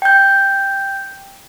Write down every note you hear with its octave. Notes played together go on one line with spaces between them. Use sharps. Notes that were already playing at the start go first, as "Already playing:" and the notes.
G5 G6